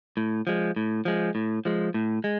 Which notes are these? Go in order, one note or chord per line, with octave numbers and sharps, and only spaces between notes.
A2
F3 G#3
A2
F3 G#3
A2
F3 G#3
A2
G#3